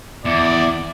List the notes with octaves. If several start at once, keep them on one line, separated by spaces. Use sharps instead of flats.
E2 D5